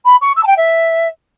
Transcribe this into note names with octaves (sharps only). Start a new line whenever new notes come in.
B5
C#6
E6
A5
G5
E5